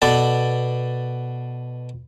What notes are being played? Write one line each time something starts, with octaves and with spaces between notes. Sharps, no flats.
B2 B3 A4 D5 A5